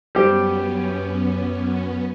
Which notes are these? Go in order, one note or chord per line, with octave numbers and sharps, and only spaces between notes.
F#2 G3 B3 C#4 G4 C5